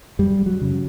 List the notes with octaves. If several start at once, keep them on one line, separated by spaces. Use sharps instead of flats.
F#2 G3
F#3
C#3